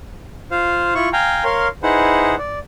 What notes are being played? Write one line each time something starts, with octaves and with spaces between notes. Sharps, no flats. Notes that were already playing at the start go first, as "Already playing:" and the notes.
F4 C5 F5
E4 F4 C#6
F5 G5 G#5 A#5
A#4 C#5 F5 C6
D#4 E4 G#4 B4 C5 F#5
D5